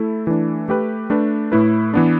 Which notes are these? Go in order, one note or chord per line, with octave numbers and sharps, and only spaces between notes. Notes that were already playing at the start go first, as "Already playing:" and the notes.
Already playing: A3 E4 A4
E3 A3 D4
A3 G4 B4
A3 D4 B4
A2 A3 E4 B4
E3 B3 D4